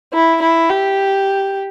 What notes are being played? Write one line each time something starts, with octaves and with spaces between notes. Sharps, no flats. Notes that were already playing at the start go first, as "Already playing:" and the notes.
E4
E4
G4